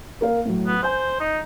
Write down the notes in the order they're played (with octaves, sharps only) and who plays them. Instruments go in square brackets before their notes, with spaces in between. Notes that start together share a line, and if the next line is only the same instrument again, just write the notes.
[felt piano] A#3 A#4 F5
A2 F#3
[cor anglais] B3
[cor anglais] C5 [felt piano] G#5 G6
[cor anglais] D#4